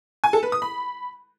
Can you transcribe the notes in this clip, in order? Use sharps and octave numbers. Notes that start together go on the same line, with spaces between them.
G#5
A4
B4
D#6
B5